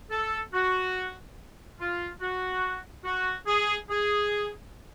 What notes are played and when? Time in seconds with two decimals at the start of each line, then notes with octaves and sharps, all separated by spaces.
0.11 A4
0.54 F#4
1.80 F4
2.21 F#4
3.05 F#4
3.47 G#4
3.90 G#4